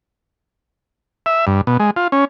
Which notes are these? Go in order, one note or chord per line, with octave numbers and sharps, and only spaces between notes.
E5
G2
B2
G#3
F4
C#4